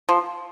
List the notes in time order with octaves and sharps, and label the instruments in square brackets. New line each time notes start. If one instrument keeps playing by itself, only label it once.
[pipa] F3